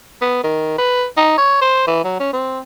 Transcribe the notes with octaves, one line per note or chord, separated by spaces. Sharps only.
B3
D#3
B4
D#4
C#5
C5
E3
F#3
C#4
C4